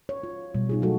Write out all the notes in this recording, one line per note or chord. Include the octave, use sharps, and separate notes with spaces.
C#5
F4
B2 G3
D#4 F4 G#4
F#3 A3 F#4 A4